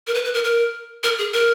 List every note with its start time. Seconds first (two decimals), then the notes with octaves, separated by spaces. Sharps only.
0.07 A#4
0.14 B4
0.25 B4
0.34 A#4
0.44 A#4
1.04 A#4
1.18 G#4
1.34 A#4